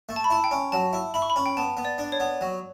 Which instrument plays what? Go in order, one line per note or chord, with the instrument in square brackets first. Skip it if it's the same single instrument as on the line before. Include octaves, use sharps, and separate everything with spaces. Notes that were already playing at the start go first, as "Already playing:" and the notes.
[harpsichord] A3
[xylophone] A5
B5
[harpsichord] E4 [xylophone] A5
[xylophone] G5
[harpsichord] C#4
[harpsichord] F#3 [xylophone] A5
[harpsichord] E4
[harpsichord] E4 [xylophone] B5
[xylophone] C#6
B5
[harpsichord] C#4
[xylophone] G5
[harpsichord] B3 [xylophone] A5
[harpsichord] B3
[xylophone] D5
[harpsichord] D4
[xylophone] C#5
[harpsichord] B3
F#3